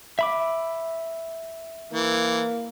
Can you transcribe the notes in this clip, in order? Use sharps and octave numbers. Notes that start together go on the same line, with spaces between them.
E5 B5 D6
E3 A#3